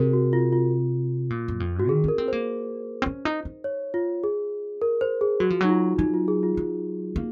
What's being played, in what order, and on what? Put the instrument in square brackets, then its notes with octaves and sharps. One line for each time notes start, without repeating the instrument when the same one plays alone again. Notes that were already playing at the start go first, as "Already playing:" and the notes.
Already playing: [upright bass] C3 [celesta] F#4 G#4 A#4
[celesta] F#4
F4
F4
[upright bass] A#2
F#2
F2
[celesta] F#4
[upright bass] D#3 [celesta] G#4
[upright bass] C#4 [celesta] A#4
[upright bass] C4
[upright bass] A#3 [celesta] C5
[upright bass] C4
C#4
D#4
D#4
[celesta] C#5
F4
G#4
[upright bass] G#3 [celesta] A#4
[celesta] C5
G#4
[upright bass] F#3 [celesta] F#4
[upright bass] F3
[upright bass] F#3 [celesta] D#4
[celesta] F4
[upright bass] F#3 [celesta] D#4
[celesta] F4
G#4
F4
[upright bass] F#3
A#3